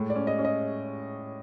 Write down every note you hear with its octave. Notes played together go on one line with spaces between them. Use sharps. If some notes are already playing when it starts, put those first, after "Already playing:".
Already playing: A2 G#3
D5
C#4
D#5
C#4
D#5